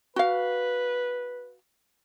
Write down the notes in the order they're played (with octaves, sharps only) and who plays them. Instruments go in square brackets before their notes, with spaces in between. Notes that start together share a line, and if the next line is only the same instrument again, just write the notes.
[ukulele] F#4 F5 [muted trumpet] B4